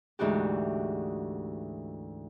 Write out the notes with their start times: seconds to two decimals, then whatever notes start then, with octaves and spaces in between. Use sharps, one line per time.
0.19 D2 G#2 E3 D4 F#4 G4